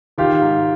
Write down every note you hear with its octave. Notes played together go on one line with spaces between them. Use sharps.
D#3 F4 G4
G#2